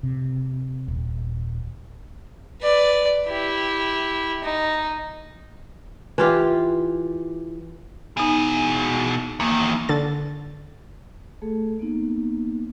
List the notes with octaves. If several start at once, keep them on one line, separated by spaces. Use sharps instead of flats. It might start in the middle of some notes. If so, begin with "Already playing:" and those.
C3
D#1
B4 D5
E4 G4
D#4
E3 F4 G4
B2 B3 D#4 G#4
E2 D#3 A#3
D3 A6
A3 G#4 A4
A#3 B3 D#4